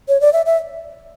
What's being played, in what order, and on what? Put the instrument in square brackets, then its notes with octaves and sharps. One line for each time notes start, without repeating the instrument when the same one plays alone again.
[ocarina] C#5
D5
E5
E5